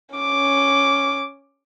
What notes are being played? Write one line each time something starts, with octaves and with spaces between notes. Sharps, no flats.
C#4 D6